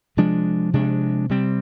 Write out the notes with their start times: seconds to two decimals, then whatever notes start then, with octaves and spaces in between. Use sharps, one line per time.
0.17 C3 F3 G#3 D4
0.73 C3 F3 G#3 D4
1.29 C3 G3 C4